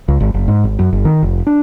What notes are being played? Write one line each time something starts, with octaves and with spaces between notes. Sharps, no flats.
C#2
G#1
F#1
G#2
G#1
F#2
G1
D#3
F1
D4